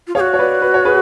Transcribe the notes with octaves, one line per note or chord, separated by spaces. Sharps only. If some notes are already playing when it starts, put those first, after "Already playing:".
F4
G#4 C#5 F5
F#4
C#5
B4 D5
B4
C#5
G#4 B4